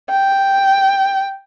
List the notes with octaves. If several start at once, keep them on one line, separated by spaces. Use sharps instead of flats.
G5